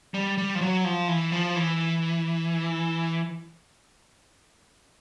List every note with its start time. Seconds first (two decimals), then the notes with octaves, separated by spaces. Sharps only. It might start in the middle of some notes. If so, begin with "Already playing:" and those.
0.14 G3
0.38 G3
0.55 F3
0.61 F#3
0.84 F3
1.08 E3
1.32 F3
1.56 E3